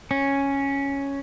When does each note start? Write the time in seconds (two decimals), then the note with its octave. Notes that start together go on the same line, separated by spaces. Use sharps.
0.11 C#4